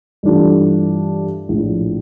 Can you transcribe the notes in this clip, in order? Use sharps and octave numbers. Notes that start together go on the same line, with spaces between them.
G2 E3 A3 D4 F4
A#1 A2 F3